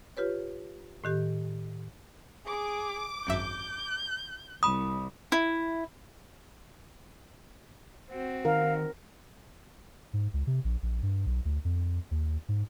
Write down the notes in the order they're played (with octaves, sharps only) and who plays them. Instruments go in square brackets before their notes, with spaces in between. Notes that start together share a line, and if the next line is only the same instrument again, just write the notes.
[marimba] F4 G4 B4 C#5
A2 D#3 G4
[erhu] G#4 [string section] D6
[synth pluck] G#1 F#2 E5 [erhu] G6
[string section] C2 [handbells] B5 D#6
[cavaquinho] E4
[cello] C4 F#4
[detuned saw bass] D#3 [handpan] A#4 [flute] F5
[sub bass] G#2
C#2
C3
A#1
A#1
G2
B1
D2
F2
D#2
G#2